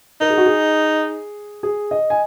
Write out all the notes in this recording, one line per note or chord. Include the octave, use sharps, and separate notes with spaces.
D#4 A#4
G#4
F#4
G#4
G#4
D#5
G#5